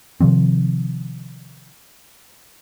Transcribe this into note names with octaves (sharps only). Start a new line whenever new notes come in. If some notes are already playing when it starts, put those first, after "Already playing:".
C3 D#3 F3 C4